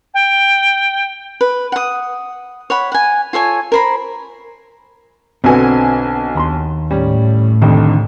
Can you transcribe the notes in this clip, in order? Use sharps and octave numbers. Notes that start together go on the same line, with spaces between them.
G5
B4
F#5 D#6
C#5 F#5 B5
F#5 G#5
F4 A4 C#5 G#5
A#4 C5 B5
B1 D3 C4 F#4 B4 G#5
D#2 B5 C6
A2 G3 C#4
C2 F2 D3 D#3